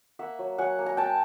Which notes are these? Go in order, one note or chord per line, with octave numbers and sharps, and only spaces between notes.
A#3 E5 F#5
F#3
F#3 F#5 G#5
A#3
A#5
A#3 G5 A5